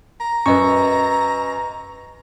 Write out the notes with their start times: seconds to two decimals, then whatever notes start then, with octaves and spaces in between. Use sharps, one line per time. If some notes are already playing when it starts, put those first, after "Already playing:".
0.20 A#5
0.46 F#2 B4 D#5 C#6